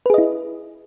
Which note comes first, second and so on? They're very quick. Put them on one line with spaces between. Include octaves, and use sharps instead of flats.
B4 G#4 D#5 E4